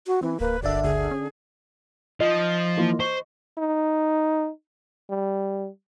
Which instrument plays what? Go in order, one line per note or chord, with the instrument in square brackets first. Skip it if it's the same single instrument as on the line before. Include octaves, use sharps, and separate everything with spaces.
[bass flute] F#4
[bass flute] E3 [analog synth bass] C4
[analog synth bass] D1 [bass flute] A#3 [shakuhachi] B4
[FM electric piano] G1 E5 [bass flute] D3 [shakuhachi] D5
[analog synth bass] D2 [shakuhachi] G#4
[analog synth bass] C#4
[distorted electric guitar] F3 [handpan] D#5
[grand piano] E3 A#3 F4
[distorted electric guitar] C5 [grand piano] C#6
[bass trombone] D#4
G3